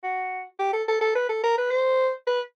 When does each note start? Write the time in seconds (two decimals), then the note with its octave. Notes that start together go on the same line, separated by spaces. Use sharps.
0.04 F#4
0.59 G4
0.73 A4
0.88 A4
1.01 A4
1.15 B4
1.29 A4
1.43 A#4
1.58 B4
1.71 C5
2.27 B4